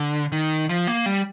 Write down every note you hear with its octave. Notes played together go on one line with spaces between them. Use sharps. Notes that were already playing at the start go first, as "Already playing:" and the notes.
Already playing: D3
D#3
F3
A#3
G3